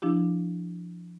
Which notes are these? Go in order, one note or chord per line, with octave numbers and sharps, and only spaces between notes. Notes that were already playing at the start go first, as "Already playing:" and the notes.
F3 D4 E4 G4